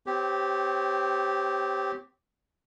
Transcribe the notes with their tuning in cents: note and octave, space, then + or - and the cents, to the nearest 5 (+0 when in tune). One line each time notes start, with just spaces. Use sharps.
C4 -30 G4 +0 C#5 -25